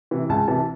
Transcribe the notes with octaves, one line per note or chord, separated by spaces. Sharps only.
C3 E3
C#2 A5
C3 E3 A5